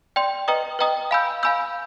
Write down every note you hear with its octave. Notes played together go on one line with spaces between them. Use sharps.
D5 G5 C6
B4 D#5 G5 A#5 D#6
B4 D#5 G5 A#5 D#6
F5 G#5 B5 E6 G6
F5 G#5 B5 E6 G6